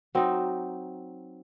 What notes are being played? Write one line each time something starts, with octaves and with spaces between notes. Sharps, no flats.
F#3 C4 D#4